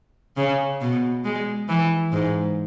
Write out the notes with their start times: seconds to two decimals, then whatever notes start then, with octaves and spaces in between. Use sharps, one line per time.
0.37 C#3
0.81 B2
1.25 G#3
1.69 E3
2.12 G#2